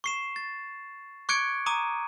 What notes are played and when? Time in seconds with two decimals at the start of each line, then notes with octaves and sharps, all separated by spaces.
0.04 C#6 C7 E7
0.36 A6
1.29 C#6 D6 F#6 G#6 C#7 D7
1.66 A#5 D6 D#6 D#7